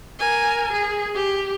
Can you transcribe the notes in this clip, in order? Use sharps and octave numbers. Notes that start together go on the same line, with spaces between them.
A#4 G#5
G#4
G4